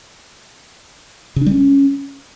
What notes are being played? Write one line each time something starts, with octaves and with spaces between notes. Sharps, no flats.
C#3
D4
G3
C#4